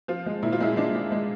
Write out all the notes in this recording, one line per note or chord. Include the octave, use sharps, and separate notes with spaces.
F3 F4
G#3
A#2 E4
F4
G#3 E4
G#3 D4
G#3
G#3